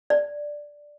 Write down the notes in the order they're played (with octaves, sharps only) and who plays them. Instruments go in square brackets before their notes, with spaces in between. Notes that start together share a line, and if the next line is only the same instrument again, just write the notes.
[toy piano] D5